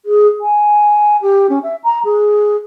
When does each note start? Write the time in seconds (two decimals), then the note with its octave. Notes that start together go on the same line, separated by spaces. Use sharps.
0.06 G#4
0.41 G#5
1.22 G4
1.50 C#4
1.63 E5
1.84 A#5
2.05 G#4